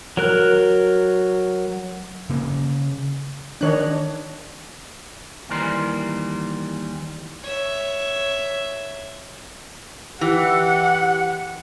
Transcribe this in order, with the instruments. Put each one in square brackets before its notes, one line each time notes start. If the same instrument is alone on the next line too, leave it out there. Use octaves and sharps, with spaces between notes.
[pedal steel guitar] F#3 A#4 F#6
[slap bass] C#3 A#3 C#4
[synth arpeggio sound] D#3 F#6 [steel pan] D4 C#5 D#5
[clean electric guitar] D#2 D#3 E3 G3 A#4 C5
[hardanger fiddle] C#5 E5
[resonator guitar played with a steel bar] E3 [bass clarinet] G4 [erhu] F#5